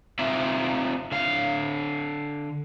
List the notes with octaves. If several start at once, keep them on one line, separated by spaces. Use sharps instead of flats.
C4 D#4 F4 D5 E5
D3 F5